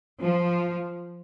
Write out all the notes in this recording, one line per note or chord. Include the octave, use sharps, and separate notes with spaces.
F3